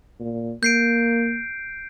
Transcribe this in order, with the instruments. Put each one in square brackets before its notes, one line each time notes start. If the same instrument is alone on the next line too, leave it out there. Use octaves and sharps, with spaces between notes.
[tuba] A#2
[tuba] A#3 [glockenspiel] G6 C7 D7